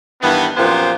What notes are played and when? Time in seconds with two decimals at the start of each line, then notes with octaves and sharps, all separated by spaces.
0.22 G2 D#3 E3 B3
0.57 F#2 A#2 F3 B3 G4 C5